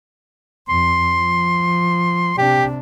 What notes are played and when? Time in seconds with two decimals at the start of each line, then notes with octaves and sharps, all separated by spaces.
0.69 F2 C6
1.17 F3
2.38 C3 D4 G4